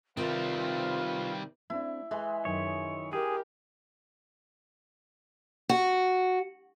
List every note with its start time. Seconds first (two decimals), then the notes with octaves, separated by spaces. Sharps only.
0.17 C3 D#3 G3 C4 F4 B4 F5
1.70 A3 C4 D4 E4
2.11 E3 G#3 A4
2.45 F#2 D#3 D#4 C#5
3.13 G4 G#4 A#4
5.69 F#4